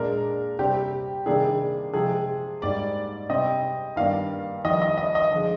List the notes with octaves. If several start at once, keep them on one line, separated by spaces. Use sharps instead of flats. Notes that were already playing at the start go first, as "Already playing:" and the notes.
Already playing: A#2 G#3 D4 A#4
C3 G3 C4 G4
C3 D#3 G3 A#3 D4 G#4
C3 F3 G#3 G#4
G#2 G3 A#3 D5
C3 G3 C4 D#5
G2 D#3 G3 A#3 D4 F5
F2 D#3 G3 D#5
D#5
D#5
D#5
D3 F3 G#3